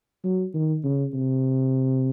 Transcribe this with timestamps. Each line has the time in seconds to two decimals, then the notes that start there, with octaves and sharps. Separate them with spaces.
0.24 F#3
0.54 D#3
0.84 C#3
1.14 C3